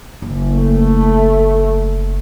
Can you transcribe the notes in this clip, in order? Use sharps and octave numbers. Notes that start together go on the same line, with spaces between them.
F#1
A3